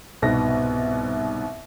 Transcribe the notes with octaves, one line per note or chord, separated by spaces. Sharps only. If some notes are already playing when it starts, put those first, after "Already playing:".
C2 G#2 B2 B3 A#6